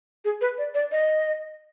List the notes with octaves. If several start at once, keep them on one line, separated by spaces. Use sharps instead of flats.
G#4
B4
D5
D5
D#5